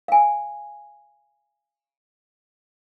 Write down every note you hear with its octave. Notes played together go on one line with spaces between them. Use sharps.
F5 G#5